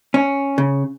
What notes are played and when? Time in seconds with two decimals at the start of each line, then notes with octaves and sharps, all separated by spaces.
0.14 C#4
0.58 C#3